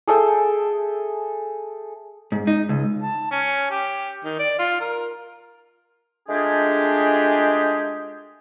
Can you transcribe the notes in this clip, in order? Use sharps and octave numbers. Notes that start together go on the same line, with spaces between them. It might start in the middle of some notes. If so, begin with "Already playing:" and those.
G#4 A4 E5 G5
G#2
D#4
C#2
A5
C#4
G4
D#3
D5
F4
A#4
G#3 A3 D4 F4 G4 G#4